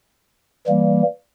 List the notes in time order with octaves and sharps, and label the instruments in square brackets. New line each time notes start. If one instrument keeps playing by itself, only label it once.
[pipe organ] E3 G3 A#3